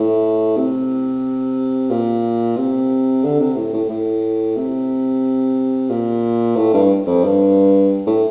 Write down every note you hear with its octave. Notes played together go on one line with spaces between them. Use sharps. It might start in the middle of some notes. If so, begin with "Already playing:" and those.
Already playing: A2
C3
A#2
C3
D3
C3
A2
A2
A2
C3
A#2
A2
G2
F2
G2
A2